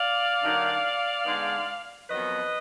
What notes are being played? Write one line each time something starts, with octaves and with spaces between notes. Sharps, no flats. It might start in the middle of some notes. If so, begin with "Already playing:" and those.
Already playing: D5 F5
D3 F#3 A#3 D#4
D3 G#3 B3 D#4
F2 D#3 F#3 B3 B4 D#5